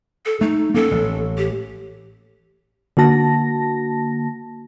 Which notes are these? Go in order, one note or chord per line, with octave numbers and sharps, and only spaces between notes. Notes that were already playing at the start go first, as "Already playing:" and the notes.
A4
A3 D#4
A#3 C#4 A4
A1
G4
D3 A#3 F#4 A5 A#6